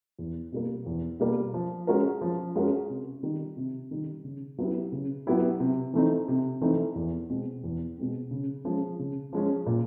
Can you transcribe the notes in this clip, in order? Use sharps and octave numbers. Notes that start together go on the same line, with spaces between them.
E2
B2 G3 A#3
E2
B2 G3 A#3
F3
G#3 C#4 F#4 A#4
F3
G#3 C#4 F#4 A#4
C3
D#3 G3
C3
D#3 G3
C#3
F#3 B3 E4 G4
C#3
F#3 B3 E4 G4
C3
E3 A3 C4 D#4
C3
E3 A3 C4 D#4
E2
B2 G#3 C4
E2
B2 G#3 C4
C#3
F3 G#3 C#4
C#3
F3 G#3 C#4
A#2